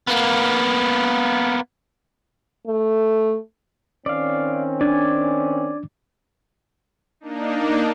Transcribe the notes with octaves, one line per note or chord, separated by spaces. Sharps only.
A#3 B3
A3
D#3 C4 C#4 D5 F5
D4 D5 G#5
A#3 D4 D#4